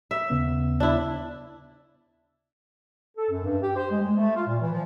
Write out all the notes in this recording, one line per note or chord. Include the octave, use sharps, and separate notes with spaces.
E5
D#2 C#3 B3
D4 E4
A4
F#2
G2
G4
C5
G#3
G#3
A3
F4
A#2
E3
F3